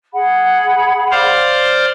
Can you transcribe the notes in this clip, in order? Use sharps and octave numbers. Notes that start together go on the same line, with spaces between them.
G#4 F#5 B5
C5 D5 F5